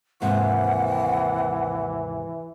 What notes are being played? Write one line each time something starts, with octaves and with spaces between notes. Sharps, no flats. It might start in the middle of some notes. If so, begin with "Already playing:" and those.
D#2 G#2 C3 E3 F#5